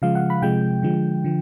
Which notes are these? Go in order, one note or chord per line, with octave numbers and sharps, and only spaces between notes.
C#3 F3 G#3 F5
F#5
B5
C3 F3 G#3 G5
D3 F3 G#3
D3 F3